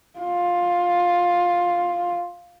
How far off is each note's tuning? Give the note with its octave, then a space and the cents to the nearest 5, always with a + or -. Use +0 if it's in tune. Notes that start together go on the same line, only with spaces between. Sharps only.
F4 +10